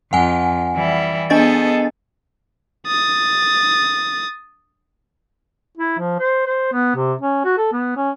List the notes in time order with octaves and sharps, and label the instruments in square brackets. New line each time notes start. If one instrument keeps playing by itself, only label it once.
[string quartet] F2 [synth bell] F#5 G#5
[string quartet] E3 G3 E4
[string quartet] B3 G#4 A4 [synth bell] D4 D#5 A6
[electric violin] D#6 A6
[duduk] E4
F3
C5
C5
B3
C3
C#4
F#4
A4
B3
C#4